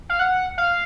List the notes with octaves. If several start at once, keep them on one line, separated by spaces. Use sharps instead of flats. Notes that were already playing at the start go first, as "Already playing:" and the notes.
F5
F#5
F5